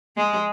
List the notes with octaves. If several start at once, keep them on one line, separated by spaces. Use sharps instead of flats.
G#3